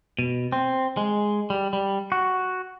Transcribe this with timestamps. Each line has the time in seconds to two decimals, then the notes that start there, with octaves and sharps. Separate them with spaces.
0.19 B2
0.52 C4
0.97 G#3
1.50 G3
1.73 G3
2.12 F#4